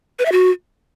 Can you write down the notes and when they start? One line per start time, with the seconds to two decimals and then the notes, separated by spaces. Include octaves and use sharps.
0.19 B4
0.26 E5
0.32 F#4